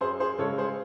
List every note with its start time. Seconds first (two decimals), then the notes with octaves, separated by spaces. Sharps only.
0.01 F#2 G#4 C5
0.20 G#4 C5
0.39 C#3 G#3 A4 C#5
0.58 G#4 C5